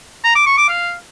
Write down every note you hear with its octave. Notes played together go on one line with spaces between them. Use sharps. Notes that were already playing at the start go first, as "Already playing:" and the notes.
A#5
D6
C#6
D6
F5